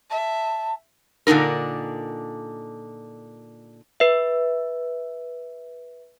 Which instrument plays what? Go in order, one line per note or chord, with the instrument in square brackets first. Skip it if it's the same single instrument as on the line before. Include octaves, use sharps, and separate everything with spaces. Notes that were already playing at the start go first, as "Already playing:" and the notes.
[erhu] E5 [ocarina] A5
[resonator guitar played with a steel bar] A#2 D3 D4 D#4 A#4
[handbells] B4 E5